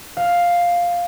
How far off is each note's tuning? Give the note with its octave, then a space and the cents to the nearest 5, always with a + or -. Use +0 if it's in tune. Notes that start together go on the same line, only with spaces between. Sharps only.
F5 +5